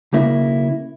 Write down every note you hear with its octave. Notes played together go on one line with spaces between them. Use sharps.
B1 C#3 A#3 E4